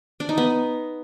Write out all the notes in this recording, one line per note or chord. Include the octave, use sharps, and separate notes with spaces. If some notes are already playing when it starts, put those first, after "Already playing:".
D4
D#4
B3